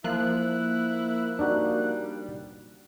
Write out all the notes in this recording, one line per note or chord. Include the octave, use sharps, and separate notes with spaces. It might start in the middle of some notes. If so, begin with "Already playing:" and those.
F3 A#3 E4 F#6
G3 D4 D#4 F#4